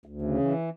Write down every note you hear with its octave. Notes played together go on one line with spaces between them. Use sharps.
D2
C#3
E3